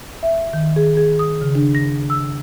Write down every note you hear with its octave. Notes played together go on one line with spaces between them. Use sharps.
E5
D#3
G#4
G#4
D#6
C#3
D4
A#6
E6